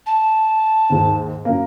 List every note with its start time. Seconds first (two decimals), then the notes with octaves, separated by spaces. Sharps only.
0.06 A5
0.90 D#2 G#2
1.45 F#2 A#3